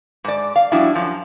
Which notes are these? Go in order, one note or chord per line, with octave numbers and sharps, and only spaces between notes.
G#2 D5
F5
F3 G3 D4 E4 F#4
F#2 F3